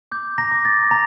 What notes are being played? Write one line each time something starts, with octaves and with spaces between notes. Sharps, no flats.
D6 G6
A#5 A#6
D6
A6
A#5